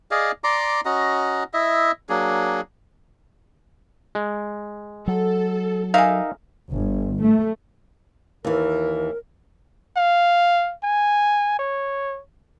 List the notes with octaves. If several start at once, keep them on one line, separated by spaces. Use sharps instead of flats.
G#4 D5 D#5 F5
D5 A#5 C6 D6
C#4 F#4 D#5 A#5
E4 D#5 E5
F#3 A#3 D4 G#4
G#3
F#3 A4
D#4 G#4 A#4 E5 F5
G1
A3
D#2 E3 A#4
F5
G#5
C#5